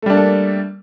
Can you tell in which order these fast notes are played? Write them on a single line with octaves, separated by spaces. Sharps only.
A3 G3 D4 A#3 A4